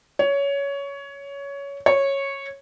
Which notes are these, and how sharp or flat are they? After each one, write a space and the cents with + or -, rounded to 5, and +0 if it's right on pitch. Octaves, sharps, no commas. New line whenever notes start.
C#5 +15
C#5 -10